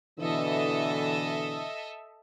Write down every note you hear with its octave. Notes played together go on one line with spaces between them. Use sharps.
B2 D3 E3 A4 D#5 E5